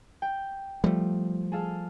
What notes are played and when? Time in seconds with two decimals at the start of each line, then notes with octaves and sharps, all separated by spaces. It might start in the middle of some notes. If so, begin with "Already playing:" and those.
0.22 G5
0.84 F3 G3 A3
1.52 G#4 A4 F5